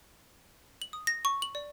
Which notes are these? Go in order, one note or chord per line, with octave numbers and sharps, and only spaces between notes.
F#7
D#6
A#6
C#6
F#7
D5